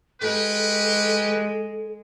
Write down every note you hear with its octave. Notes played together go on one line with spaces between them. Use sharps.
G#3 G4 A4 B4